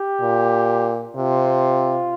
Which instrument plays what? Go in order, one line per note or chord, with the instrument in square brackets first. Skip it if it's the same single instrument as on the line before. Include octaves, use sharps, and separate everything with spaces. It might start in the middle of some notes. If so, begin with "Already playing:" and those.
Already playing: [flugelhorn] G4
[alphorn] A#2
[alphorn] C3 [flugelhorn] F4